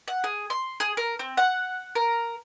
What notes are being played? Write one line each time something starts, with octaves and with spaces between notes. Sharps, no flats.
F#5
G#4
C6
G#4
A#4
C4
F#5
A#4